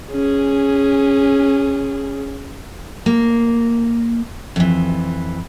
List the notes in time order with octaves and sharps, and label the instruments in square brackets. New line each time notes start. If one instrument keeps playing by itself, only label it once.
[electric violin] C#4 G#4
[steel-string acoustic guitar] A#3
F2 E3